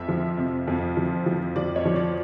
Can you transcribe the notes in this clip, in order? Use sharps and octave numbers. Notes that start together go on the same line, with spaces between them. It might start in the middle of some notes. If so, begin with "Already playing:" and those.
Already playing: F2 E5
F3
C3
F2
F3
F3
F3 D5
C#5
F3
D5